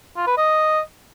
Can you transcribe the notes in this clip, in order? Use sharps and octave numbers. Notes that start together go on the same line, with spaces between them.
F4
B4
D#5